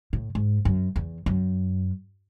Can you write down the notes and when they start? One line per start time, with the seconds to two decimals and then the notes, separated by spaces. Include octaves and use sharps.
0.13 A2
0.35 G#2
0.65 F#2
0.96 E2
1.26 F#2